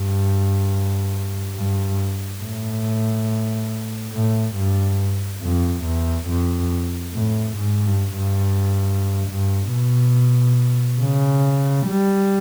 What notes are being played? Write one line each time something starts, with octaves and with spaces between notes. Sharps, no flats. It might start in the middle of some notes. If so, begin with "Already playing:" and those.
Already playing: G2
G2
A2
A2
G2
F2
E2
F2
A2
G#2
G2
G2
G2
B2
C#3
G3